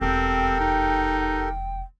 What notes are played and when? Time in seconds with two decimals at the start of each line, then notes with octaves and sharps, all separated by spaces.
0.01 E1 F2 C4 G4 A4 A#4 G5
0.60 D#4